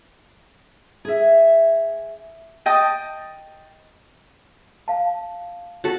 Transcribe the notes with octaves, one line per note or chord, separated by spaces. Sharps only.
G#4 E5
D#5 G5 A5 D#6
F5 A5
F#4 A4